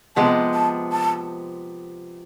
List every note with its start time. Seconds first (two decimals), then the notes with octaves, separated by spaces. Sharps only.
0.16 C3 F3 G#3 B3 A5
0.54 A5
0.92 A5